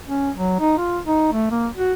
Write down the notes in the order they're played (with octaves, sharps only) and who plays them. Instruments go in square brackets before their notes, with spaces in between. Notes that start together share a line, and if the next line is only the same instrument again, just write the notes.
[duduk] C#4
F#3
D#4
F4
D#4
A3
A#3
F#4